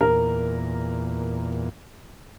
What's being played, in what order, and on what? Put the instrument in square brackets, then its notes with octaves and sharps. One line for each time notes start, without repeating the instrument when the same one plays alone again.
[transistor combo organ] E2 A#2 [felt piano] A#4